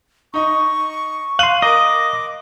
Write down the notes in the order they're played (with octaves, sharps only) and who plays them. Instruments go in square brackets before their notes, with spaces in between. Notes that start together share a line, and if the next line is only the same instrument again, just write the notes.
[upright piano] D#4 D#5 [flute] C#6
[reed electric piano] F5 C6 [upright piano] F#6 D#7 F#7
[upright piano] A#4 [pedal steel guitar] D#5 [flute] D6